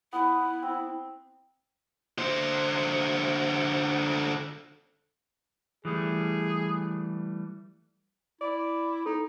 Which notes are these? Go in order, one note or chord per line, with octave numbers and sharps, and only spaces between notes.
B3 E4 B4
C4
D3 C5
E3 G3 A3 G#4
E4 D5
D#4 A4